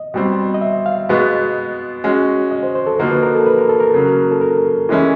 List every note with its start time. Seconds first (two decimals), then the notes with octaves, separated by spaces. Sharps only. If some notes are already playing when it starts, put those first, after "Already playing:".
Already playing: D#5
0.14 B2 G3 C4
0.54 D#5
0.62 E5
0.86 F5
1.09 B2 G#3 B3
2.04 G#3 C#4 F#4
2.51 D#5
2.63 C5
2.75 C5
2.87 A4
2.99 D3 F3 A#3 D#4 F#4 A#4
3.11 B4
3.23 A#4
3.35 A4
3.46 B4
3.58 A#4
3.69 A4
3.80 A#4
3.94 C#3 F#3 A#3
4.32 A4
4.41 A#4
4.89 E3 G#3 C#4 E4